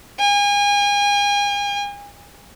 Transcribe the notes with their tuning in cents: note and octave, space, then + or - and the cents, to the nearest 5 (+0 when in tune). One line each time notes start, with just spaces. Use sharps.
G#5 -35